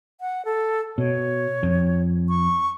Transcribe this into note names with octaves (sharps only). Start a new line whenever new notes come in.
F#5
A4
B2 C#5
F2
C#6